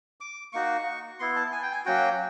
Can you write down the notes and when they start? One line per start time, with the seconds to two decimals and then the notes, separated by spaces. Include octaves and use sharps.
0.21 D6
0.53 A#3 D#4 F#4 C#6
1.19 B3 E4 C6
1.36 A5
1.52 G#5
1.63 G5
1.72 G#5
1.85 F#3 A#3 C#4 F#4 G5